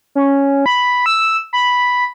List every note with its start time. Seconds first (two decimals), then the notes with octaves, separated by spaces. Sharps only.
0.15 C#4
0.66 B5
1.06 E6
1.53 B5